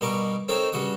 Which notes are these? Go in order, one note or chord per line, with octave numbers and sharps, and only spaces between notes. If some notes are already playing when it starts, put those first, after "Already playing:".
G2 B2 A#4 D#5 C#6 D6
C4 D#4 A4 A#4 C#5
G2 C#3 F#4 F#5 D#6